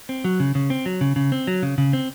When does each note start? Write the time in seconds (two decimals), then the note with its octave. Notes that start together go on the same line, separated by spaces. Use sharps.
0.09 C4
0.24 F#3
0.40 C#3
0.55 C#3
0.70 C4
0.86 F#3
1.01 C#3
1.16 C#3
1.32 C4
1.47 F#3
1.63 C#3
1.78 C#3
1.93 C4